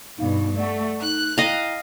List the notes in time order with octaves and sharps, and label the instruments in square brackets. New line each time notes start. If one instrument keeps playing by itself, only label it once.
[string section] G2 B2 [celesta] D#4 F5
[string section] A3 [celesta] D5 F#5
[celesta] D#4 [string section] F#6
[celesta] E4 G5 A#5 [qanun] D#5 F5